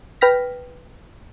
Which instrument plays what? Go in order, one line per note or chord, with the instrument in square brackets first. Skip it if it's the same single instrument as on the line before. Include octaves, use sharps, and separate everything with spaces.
[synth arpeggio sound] B4 G5 F6 A#6 B6